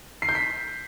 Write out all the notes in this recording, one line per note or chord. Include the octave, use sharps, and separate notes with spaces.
C7
G6
B6